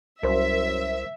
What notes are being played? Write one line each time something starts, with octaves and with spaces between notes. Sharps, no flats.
C2 F#2 A#4 C5 E5